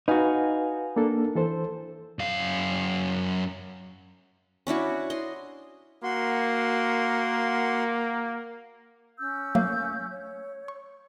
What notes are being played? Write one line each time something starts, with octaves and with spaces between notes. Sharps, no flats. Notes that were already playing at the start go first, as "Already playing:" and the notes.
D#4 F#4 B4 F5 G#5
A#3 D4 A4
E3 A4 C5
F#2 F5
C#4 D4 E4 F#4
D#5 C6
A#3 F#4 C6
C#4 E6 G6
F#3 A3 A#3
C#5
C#6